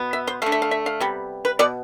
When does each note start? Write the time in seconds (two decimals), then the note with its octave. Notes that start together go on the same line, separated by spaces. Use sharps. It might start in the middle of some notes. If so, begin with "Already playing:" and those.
Already playing: B2 B3
0.13 E5
0.27 C5
0.42 D3 A3 F5
0.52 E5
0.62 F5
0.71 E5
0.86 F5
1.00 C3 G3 B3
1.45 B4
1.59 B2 B3 D5